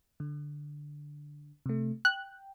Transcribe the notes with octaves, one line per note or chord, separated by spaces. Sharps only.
D3
C3 A3
G5 F#6